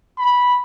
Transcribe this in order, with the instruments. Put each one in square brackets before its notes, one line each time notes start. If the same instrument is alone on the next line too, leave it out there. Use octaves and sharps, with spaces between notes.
[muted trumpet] B5